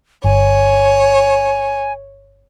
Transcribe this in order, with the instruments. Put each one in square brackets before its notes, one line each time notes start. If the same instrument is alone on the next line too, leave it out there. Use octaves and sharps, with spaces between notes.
[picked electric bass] G1 [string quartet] C#5 [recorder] G#5